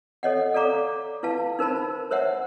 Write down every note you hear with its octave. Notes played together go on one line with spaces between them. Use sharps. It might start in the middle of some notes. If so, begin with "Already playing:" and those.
A4 C#5 D#5 F#5
A4 D5 F5 A#5 D6
E4 B4 F5 A5
D#4 A#4 C5 A5 B5
A#4 C5 C#5 E5 F#5